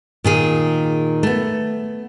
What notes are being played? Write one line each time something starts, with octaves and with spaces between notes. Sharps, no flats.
A#2 D#3 G#4
A3 B3